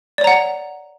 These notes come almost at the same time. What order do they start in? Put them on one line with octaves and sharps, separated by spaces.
D5 C#5 A#5 F#5